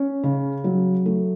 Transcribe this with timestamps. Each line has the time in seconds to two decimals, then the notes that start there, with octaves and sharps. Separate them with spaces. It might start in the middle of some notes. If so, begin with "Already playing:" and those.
Already playing: C#4
0.23 C#3
0.64 F#3
1.06 A3